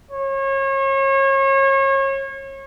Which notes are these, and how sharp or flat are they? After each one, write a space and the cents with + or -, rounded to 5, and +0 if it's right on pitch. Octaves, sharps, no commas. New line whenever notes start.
C#5 -35